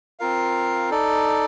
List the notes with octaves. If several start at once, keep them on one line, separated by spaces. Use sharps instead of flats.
C4 F4 A#4 F5
D#4 A4 D5